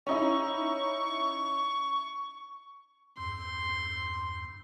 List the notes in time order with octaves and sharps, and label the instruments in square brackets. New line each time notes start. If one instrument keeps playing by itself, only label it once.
[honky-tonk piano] C#4 D#4 E4 [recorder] C#6
[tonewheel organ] E2 G2 [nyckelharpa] C6